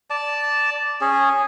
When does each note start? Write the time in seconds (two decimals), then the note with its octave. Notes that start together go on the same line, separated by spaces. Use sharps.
0.10 D5 A5
1.01 C#4 G#4